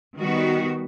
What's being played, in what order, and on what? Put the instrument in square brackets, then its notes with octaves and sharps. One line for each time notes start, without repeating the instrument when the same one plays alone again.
[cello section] D#3 G3 B3 F#4